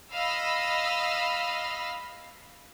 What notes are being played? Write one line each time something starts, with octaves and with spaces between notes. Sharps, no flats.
D#5 F5 B5 E6